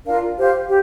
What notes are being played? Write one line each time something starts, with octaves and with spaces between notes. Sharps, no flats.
D4 F4 A#4 F5
G4 C5 F5
G4